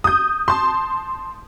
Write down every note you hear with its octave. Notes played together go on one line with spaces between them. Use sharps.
D#6 G6
A5 C6